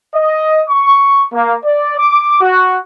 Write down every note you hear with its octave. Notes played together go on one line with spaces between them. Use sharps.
D#5
C#6
A#3
D5
D6
F#4